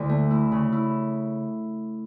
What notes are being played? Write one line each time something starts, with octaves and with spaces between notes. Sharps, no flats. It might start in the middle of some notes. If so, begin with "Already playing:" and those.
Already playing: D2 D3 E4
A3
E4
C#3
E4